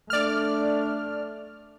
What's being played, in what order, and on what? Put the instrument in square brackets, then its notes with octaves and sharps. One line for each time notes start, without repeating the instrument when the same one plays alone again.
[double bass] A3 D4 [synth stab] D5 F6